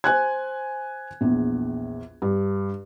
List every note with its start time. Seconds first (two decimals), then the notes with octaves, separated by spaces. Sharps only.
0.04 C5 G#5 F#6 G#6
1.21 A#1 E2
2.22 G2